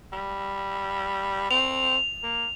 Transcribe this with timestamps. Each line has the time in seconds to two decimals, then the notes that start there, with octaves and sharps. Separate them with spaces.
0.13 G3
1.51 C4 F7
2.24 A#3